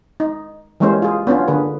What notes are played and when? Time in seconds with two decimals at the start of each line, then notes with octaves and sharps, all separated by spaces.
0.20 D#4
0.80 E3 G3 G#3 A#3 C#4 C5
1.02 F4 G#4
1.27 B3 C#4 D4 F4
1.48 D3 A#3 G#4 B4